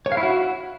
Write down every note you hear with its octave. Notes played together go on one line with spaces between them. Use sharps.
C#5
F5
E4
F#4